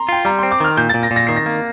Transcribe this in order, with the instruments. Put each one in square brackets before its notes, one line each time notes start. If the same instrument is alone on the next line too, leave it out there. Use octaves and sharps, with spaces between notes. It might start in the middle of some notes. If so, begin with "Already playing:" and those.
Already playing: [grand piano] A#5 C6
[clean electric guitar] F4 [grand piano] G5
[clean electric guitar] G3 [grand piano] A#5
[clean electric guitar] C4 [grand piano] C6
[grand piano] D6
[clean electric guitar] D#3 [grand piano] F6
[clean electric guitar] A#2 [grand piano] G6
[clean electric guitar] A#2 [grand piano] A6
[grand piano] A#6
[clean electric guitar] A#2
[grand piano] A#6
[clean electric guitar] D#3 [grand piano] C7
[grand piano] A#6
[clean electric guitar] A#3